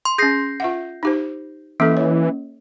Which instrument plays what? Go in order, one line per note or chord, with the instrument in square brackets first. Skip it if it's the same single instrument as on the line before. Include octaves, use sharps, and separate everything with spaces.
[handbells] C6
[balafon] C#4 G#4 [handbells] G6 A#6 C7
[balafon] F4 E5 F#5
D#4 G4 C5
[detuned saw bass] E3 [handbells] A#3 C#4 [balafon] A4 E5
[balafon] C#5